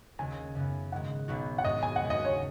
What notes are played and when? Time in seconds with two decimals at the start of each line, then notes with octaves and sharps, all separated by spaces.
0.19 D#2 C#3 G#3 D#4 G#5
0.55 F#2 C#3 B3
0.92 G#2 D#3 G#3 F#5
1.28 B1 B2 B3 D#4 F#4
1.58 F#5
1.65 G#2 G#3 D#4 F#4 D#5
1.83 G#5
1.96 F#5
2.02 D#2 C#3 G#3
2.10 D#5
2.25 C#5